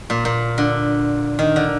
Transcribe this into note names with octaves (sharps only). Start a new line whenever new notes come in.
A#2
A#2
D3
D#3
D3